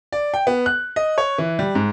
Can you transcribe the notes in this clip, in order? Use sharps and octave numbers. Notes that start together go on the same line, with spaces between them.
D5
G5
B3
F#6
D#5
C#5
E3
G3
G#2